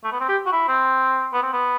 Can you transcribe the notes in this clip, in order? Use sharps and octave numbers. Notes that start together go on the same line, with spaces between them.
A3
B3
C4
G4
F#4
E4
C4
B3
C4
B3